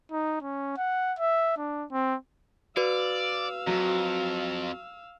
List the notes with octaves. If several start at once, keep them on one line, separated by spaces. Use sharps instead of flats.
D#4
C#4
F#5
E5
D4
C4
F#4 B4 D5 F5 E6
F2 F#3